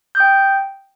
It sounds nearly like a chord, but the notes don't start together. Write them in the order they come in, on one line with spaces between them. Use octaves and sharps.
G6 D#6 G5